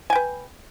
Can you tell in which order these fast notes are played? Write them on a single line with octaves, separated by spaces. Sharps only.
G#5 G5 B4